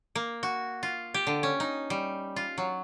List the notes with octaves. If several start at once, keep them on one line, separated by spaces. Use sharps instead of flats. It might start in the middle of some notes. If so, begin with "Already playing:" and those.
A#3
F#4
F4
G4
D3
C#4
D#4
G3
F4
F#3